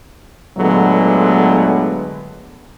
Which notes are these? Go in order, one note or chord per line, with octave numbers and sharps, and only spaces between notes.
A#2 D3 F#3 G#3 A3 B3